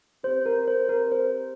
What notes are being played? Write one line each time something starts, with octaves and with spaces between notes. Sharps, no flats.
C4 G4 C5
A#4
A#4
C5
A#4
C5